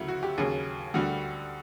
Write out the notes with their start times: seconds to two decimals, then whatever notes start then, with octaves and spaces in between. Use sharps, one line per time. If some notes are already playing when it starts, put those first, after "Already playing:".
Already playing: D2 C#3 F#3 E4
0.08 F#4
0.23 G4
0.38 D#2 C#3 F#3 G#4
0.94 D2 D3 G3 F#4